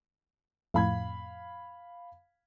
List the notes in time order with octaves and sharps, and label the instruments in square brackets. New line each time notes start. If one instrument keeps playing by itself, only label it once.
[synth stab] F2 A2 [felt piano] F5 B5 G#6